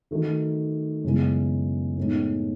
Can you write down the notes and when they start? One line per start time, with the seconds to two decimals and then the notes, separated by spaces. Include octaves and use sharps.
0.11 D#3 A3 D#4 F#4
1.04 F#2 C#3 G#3 B3 E4
1.98 A2 G#3 B3 D#4